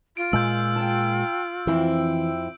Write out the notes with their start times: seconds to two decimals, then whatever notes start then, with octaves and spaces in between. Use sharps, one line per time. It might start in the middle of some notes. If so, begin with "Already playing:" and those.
0.17 F4 D7
0.33 A#2 G#3 E6 G6
0.76 G5 A5
1.67 F2 E3 C4 E4